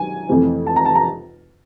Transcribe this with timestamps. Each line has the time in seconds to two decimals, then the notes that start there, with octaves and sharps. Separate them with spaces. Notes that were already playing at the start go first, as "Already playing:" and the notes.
Already playing: D#3 F#3 G#5
0.29 F2 C3 E3 A3 C4
0.67 A5
0.76 A#5
0.85 A5
0.95 A#5